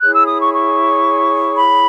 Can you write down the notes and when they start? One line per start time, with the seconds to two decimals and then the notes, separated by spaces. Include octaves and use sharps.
0.01 E4 G#4 C#5 F#6
0.14 E6
0.27 D#6
0.39 C#6
0.53 C#6
1.56 B5